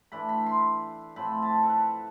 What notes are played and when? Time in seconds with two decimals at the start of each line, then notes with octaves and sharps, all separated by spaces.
0.12 E3 A3 D4 B5
0.29 B5
0.46 C6
1.16 A2 F3 C4 B5
1.42 A5
1.63 A4
1.69 B4